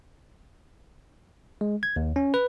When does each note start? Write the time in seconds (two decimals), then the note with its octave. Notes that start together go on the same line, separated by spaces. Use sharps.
1.61 G#3
1.83 G#6
1.96 D#2
2.16 C#4
2.34 B4